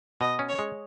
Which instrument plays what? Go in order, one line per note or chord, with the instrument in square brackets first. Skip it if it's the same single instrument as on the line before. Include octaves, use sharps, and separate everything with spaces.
[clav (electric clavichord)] B2 [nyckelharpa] D#5
[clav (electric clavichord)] C#4
[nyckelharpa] C#5
[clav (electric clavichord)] G#3